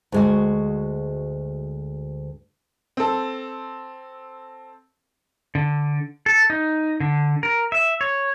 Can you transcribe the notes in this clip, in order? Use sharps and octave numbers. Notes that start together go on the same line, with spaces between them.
D2 G#3 F#4
C4 A4
D3
A4
D#4
D3
A#4
E5
C#5